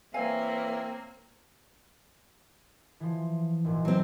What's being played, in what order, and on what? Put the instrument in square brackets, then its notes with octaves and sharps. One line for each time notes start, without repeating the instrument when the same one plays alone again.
[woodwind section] E3 C#5 E5 [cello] A#3 [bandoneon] C4 [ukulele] F5 G#5
[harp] E3 F3
G#1 A#2
[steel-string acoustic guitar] F#3 C4